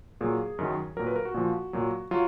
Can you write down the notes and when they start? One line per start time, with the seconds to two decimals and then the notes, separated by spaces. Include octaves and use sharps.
0.21 A#2 F#3 G#4
0.59 F#2 D#3 F#3
0.97 A#2 F#3 A#4
1.07 B4
1.16 A#4
1.25 F#4
1.34 A#2 F3
1.73 A#2 F#3
2.11 F#3 F4